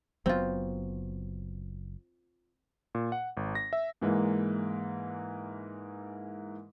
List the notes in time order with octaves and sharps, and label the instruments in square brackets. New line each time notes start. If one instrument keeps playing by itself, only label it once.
[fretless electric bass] F#1 F#3 B3 [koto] C4 F4
[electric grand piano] A#2
F#5
G#1
A#6
E5
[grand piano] G#2 E3 G#3 A#3